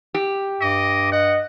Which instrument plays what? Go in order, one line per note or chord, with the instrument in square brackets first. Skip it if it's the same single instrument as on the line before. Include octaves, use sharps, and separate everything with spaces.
[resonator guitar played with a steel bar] G4
[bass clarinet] G2 [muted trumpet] D#5 [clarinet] D6
[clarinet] D#5 [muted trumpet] F#5